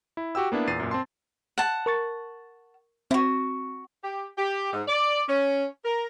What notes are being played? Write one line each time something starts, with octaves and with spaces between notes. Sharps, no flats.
E4
F#4 G4 G5 E6
A#3 B3 D4 E4
E2 A#2 A6 C7 D#7
F#2 A#2
C4 A5 C6
F#5 A5
A#4 C#6 A6
C4 E4 F#4
G4
G4
G#2
D5
C#4
A#4